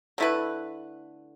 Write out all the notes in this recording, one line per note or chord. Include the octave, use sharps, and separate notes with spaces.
D3 A3 E4 B4